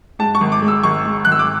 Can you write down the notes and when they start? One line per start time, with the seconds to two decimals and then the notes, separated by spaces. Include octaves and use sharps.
0.19 G#2 A5
0.35 C#6
0.41 G#1
0.52 D6
0.62 G#3
0.68 E6
0.83 G#1 C#6
1.05 G#2
1.25 G#1 F#6
1.32 E6
1.39 D6